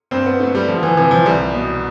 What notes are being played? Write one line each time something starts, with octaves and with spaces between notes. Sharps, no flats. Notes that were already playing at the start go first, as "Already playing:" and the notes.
G2 C4
B3
D3 A3
G3
D2 F3
E3
C3 E3
F3
C2 G3
B2